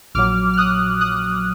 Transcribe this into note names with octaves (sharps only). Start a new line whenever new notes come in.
A#1 A#2 F#3 D6 F6
F6
D#6 F#6
D#6 F#6